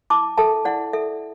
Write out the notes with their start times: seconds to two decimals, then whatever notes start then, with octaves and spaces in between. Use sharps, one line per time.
0.10 E4 A5 D6
0.38 A4 E5 A5
0.65 E4 D5 F#5
0.93 A4 E5